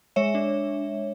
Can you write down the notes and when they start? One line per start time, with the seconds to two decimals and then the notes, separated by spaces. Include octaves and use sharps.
0.16 G#3 C#5 E5
0.35 D4